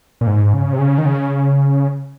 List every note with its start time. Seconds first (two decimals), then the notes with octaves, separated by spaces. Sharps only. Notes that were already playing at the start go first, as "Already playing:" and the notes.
0.21 A#2
0.27 G#2
0.54 C#3
0.73 C3
0.79 C#3
0.98 D#3
1.06 C#3